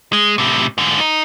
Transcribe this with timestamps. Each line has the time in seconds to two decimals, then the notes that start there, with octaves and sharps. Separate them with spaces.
0.13 G#3
0.38 A2 C3
0.78 G#2 D3
1.00 D#4